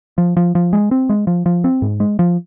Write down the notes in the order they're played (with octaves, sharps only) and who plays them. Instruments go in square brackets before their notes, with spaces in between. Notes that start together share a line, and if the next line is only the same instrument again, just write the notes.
[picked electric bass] F3
F3
F3
G#3
C4
G#3
F3
F3
C4
G#2
G#3
F3